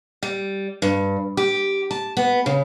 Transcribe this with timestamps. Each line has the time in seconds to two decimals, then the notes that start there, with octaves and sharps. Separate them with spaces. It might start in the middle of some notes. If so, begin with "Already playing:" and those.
0.23 G3
0.82 G2
1.37 G4
1.91 A5
2.17 B3
2.46 C#3